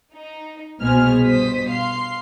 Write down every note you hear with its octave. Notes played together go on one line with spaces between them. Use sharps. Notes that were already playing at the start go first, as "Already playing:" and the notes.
D#4
C2 B2 G#4 C5 F6
G2 B2 C5 D#6 B6
F5 C6 C7